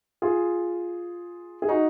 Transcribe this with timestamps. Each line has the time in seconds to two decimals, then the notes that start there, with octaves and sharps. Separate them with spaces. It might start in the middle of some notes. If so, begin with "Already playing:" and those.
0.22 F4 G#4
1.62 G#4
1.69 D#4 F#4